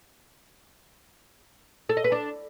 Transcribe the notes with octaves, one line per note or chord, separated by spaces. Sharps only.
A4
D#5
B4
D4